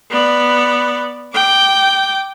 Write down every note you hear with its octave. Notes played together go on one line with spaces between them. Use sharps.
B3 D5
G5 D6